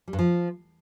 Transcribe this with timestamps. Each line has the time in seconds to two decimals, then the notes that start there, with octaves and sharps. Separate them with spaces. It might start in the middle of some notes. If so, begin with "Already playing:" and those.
0.08 G3
0.13 G2
0.19 F3